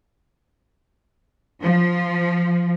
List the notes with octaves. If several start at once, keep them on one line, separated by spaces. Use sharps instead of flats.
F3